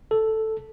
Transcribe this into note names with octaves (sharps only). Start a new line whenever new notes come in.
A4